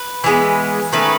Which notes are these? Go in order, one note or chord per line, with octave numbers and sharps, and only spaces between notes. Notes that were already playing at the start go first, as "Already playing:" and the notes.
Already playing: B4
E3 G#3 B3
D#3 A3 C#4 B4